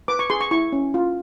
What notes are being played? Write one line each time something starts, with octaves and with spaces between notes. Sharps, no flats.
B4 D6
C#6
G#4 C6
C#6
E4 C#6
C#4
F4